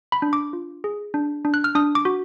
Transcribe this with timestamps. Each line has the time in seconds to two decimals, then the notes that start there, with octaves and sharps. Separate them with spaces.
0.12 B5
0.22 D4
0.33 D6
0.53 F4
0.84 G#4
1.14 D4
1.45 D4
1.54 F#6
1.64 F6
1.75 D4 D#6
1.95 D6
2.05 F#4